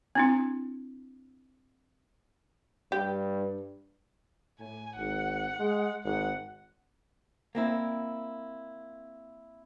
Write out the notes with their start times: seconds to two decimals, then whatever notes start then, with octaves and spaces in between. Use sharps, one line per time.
0.15 C4 D4 E4
2.92 G2 G4
4.60 A2 G#5
4.96 G#1 F#5
5.59 G#3
6.04 G#1 F#5
7.55 A#3 C4 E4